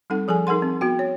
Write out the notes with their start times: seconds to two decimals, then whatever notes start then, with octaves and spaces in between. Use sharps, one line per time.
0.10 G3 C4 D#4 A4 F#5
0.28 F3 G#4 A4 G#5
0.47 D#4 G#4 A#4 F#5 C6
0.62 C4
0.81 B3 F#4 G5
0.99 C#5